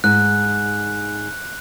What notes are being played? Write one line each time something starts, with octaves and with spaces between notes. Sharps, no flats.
G#2 F#6